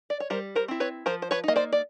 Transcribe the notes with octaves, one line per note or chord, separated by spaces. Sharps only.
D5
C#5
G3 A#4 C5
A#4 C5
C4 E4
B4 C#5
F3 A#4 C5
C5
B4 C#5
A#3 D#4 D#5
C5 D5
D5